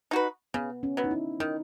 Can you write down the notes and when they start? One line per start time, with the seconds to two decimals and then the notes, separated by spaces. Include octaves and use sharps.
0.11 D#4 F#4 B4
0.54 C#3 B3
0.83 C#4
0.97 F#3 B3
1.04 D#4
1.11 E4
1.40 D#3 D#4